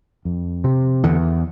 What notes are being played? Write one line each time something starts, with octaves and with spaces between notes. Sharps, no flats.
F2
C3
E2 D3